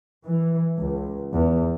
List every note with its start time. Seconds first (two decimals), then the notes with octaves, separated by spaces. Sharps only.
0.25 E3
0.77 C#2
1.34 E2